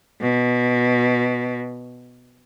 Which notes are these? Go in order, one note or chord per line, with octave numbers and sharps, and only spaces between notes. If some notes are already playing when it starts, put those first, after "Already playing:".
B2